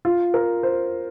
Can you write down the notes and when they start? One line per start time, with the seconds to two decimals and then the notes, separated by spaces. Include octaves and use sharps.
0.05 F4
0.34 A#4
0.63 C5